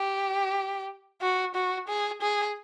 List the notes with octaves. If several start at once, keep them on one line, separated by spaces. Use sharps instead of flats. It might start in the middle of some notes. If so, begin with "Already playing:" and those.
Already playing: G4
F#4
F#4
G#4
G#4